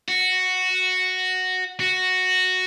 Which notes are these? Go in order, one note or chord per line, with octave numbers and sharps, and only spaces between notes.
F#4
F#4